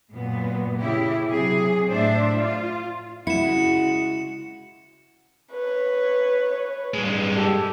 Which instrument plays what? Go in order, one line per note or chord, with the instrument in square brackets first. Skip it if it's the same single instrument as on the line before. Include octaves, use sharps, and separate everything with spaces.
[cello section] F#2 A#2 B3
C#3 C#4 E4 G4
C3 F#3 G#4
A2 D4 C5 D5 E5
F4
[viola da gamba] C#3 G#3 F#4 [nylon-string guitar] E4 [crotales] C#7 E7
[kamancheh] B4 C#5
[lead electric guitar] G2 G#3
[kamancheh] G4 A4